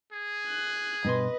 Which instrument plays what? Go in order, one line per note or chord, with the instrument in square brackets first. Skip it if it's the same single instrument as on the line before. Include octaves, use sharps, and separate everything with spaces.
[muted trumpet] G#4
[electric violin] F#6
[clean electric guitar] G2 B2 C6 [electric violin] B4 D#5